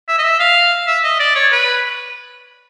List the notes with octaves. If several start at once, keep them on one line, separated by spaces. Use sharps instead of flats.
E5
D#5
E5
F5
E5
D#5
D5
C#5
B4